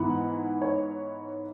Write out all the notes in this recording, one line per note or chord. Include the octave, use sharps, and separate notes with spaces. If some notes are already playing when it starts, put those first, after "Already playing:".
Already playing: G#2 E3 B3 E4 F#5
C#5